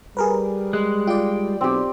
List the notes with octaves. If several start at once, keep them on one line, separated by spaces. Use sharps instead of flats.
G3 G#4 A#4 B4
G#3 F#6
F4 D5 G5
B1 C4 G4